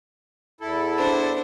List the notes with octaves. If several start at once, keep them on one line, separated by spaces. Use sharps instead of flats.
E2 E4 A4
D4 C5